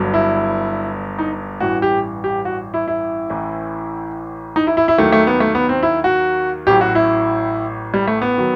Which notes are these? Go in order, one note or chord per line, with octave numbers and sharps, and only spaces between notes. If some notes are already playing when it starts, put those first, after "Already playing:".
Already playing: G1 G2 F#3
E4
D#4
A1 G2 E3 F#4
G4
G4
F#4
E4
E4
A1 A2 E3
D#4
E4
E4
E4
D#2 D#3 F#3 A3
A3
B3
A3
B3
C4
E4
F#4
A1 A2 F#3 G4
F#4
E4
G3
A3
B3
D#3 F#3